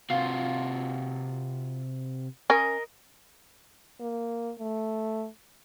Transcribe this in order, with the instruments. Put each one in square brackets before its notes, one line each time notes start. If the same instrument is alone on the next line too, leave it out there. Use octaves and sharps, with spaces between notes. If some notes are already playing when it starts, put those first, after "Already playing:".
[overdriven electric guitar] C3 F#4 [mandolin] F4
[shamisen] C#4 [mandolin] A#4 D#5
[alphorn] A#3
A3